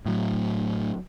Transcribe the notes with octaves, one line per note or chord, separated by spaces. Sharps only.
A2 F#3